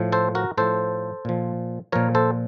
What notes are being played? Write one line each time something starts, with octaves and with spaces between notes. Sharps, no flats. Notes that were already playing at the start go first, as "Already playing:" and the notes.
Already playing: A2 F3
A4 C5
F#4 A#4
A2 F3 A4 C5
A#2 F3
A#2 F3 A#4 C#5
A4 C5